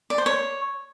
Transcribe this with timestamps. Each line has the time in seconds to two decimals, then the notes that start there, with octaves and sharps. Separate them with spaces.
0.10 D5
0.18 C5
0.26 C#5